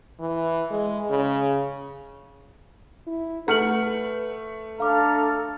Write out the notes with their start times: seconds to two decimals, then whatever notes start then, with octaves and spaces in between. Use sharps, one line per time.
0.20 E3
0.71 G#3
1.10 C#3
3.07 E4
3.48 A3 B4 F#5 F6 C#7 F#7
4.80 D4 A4 F5 A#5 D6 F6